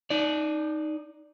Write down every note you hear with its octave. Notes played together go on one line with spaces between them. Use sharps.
D#4 D5